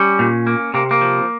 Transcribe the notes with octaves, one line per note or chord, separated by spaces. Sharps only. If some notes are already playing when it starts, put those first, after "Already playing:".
Already playing: G3 C#4
A#2
A#3
C3 A#3
A#3
F3